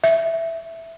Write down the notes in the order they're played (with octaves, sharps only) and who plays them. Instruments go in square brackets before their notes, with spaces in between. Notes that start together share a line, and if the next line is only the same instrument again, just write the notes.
[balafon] E5